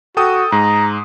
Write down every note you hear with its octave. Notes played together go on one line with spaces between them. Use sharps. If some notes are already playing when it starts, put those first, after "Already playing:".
F#4 A4 G5 D#6
G#2 G#3 A#5